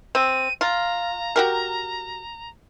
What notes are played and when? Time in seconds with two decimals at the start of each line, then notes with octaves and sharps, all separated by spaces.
0.15 C4 D#7
0.61 F4 A#5
1.36 F#4 G4 A#4